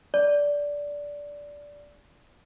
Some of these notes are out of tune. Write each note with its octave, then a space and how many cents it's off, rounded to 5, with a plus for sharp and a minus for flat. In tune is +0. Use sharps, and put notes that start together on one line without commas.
D5 -10